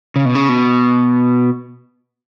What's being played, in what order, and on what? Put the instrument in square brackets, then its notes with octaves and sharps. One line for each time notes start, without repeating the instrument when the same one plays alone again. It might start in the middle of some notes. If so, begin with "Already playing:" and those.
[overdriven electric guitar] C#3
B2
C#3
B2